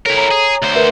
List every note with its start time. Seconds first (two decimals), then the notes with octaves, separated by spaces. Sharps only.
0.06 E4 A4 A#4 C#5
0.17 C#5 A#5
0.31 G#4
0.63 D2 C5
0.75 A#4 B4 E5